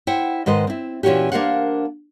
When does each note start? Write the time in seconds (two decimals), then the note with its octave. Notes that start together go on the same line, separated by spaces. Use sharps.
0.07 E4 C5 F#5 G5
0.46 G#2 D#3 B4 C5 D#5
0.67 C4 E4
1.03 A#2 E3 C#4 E4 F#4 G4
1.32 A#3 D4 A#4 C5 F5 F#5